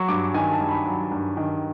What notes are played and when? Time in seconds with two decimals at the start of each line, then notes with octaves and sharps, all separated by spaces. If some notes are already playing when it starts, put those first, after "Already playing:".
Already playing: F#3 C#6
0.08 G2 D6
0.34 D#3 G#5
0.52 A5
0.60 G2
0.69 B5
0.86 F#3
1.11 G2
1.37 D#3